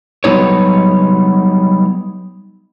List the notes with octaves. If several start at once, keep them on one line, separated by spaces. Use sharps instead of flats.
F#3 G3 B3 D#4 C#5